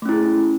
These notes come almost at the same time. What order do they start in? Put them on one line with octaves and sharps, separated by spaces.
A3 C#4 E4 G#4